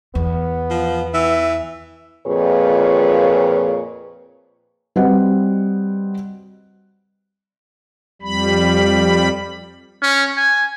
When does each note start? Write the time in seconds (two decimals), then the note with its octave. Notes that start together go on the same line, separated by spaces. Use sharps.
0.15 E2 B3
0.70 F3
1.14 E3 E5
2.26 F2 A#2 G#4 B4 C#5
4.96 G3 C4 F#4 B4 D#5 F#5
8.22 F2 G3 B5
10.02 C#4
10.37 G#5